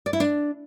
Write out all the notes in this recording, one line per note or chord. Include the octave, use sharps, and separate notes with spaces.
D5
E4
D4